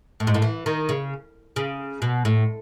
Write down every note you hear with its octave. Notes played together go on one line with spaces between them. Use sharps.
A2
G#2
A2
E3
D#3
C#3
C#3
B2
A2